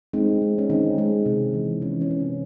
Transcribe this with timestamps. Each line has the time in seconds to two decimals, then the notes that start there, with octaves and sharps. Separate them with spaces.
0.13 G#3 C4 D#4
0.42 G#3
0.58 C#4
0.70 D#3 C4 D#4
0.98 G#3
1.26 C3
1.54 E3
1.82 E3 C#4
2.01 C#4
2.11 C3
2.20 C4